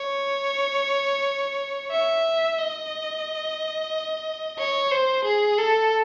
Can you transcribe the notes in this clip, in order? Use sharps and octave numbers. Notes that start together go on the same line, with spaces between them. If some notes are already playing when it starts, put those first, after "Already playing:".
Already playing: C#5
E5
D#5
C#5
C5
G#4
A4